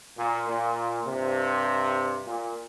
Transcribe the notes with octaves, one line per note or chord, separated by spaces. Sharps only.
A#2
A#2
G2 C3
A#2